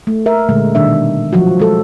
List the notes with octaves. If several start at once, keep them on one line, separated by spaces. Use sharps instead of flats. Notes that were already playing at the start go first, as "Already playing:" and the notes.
A3
A3 A#4 E5
A#2 D3 G#3 A3
B2 D#3 G3 D4 E5
F3 F#3 F#4
G#3 A4